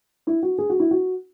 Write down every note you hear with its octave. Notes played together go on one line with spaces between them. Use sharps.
E4
F#4
G#4
F#4
E4
F#4